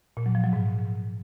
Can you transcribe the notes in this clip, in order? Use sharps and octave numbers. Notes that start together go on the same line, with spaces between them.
A#2
F#3
F3
F#3
G#2